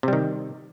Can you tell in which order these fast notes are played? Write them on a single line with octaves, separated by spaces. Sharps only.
C3 G3 D#3